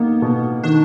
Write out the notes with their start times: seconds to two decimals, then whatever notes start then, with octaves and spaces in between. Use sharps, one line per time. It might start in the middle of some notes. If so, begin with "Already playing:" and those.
Already playing: A#3 B3 D#4
0.22 B2
0.63 D#3 D4